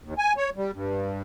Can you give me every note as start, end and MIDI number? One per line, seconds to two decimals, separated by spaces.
0.04 0.14 39
0.18 0.33 80
0.37 0.50 73
0.56 0.71 55
0.74 1.22 43